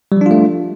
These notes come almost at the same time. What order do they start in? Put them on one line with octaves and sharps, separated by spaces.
G3 F3 D4 F4 A3